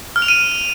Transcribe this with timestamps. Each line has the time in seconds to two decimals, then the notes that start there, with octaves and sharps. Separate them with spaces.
0.16 F6
0.22 F7
0.28 D#7